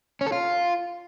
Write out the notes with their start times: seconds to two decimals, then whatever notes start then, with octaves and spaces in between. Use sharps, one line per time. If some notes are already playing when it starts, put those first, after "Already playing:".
0.21 C#4
0.27 A4
0.32 F4